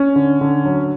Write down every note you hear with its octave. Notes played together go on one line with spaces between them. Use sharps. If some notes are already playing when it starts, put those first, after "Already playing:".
Already playing: C#4
D3
D3
F#3